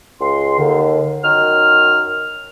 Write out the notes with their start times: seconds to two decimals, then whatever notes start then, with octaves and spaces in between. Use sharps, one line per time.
0.21 C#2 C6
0.58 D#2 D3
1.23 F#2 D#3 F6